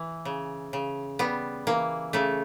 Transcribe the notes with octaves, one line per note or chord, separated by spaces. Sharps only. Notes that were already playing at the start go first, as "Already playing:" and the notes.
Already playing: E3
C#3
C#3
G3 B3
E3 A#3
C#3 A3